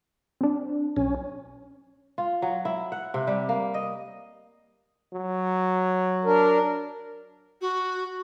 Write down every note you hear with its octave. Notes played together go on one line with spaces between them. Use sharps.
C4 D4
B1 C#4
F4
F#3
E4
F#5
C3
G3
A#3
D#5
F#3
D4 A#4
F#4